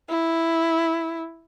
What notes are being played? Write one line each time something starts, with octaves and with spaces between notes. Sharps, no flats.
E4